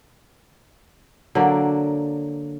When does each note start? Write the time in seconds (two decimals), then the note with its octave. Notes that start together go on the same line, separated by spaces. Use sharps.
1.35 D3 F#3 A#3 D5